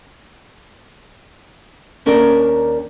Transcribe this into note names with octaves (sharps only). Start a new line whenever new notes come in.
D#2 C#4 D4 A#4